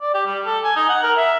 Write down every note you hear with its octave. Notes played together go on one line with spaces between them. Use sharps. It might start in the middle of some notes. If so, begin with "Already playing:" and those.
D5
G4
G3
A4
G#5
D#4
F#5
A#4
E5